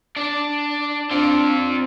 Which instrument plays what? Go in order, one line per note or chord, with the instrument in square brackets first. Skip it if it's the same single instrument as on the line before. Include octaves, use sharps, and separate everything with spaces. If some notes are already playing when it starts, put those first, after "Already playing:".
[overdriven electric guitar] D4 D5
[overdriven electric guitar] C4 F4 [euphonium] D4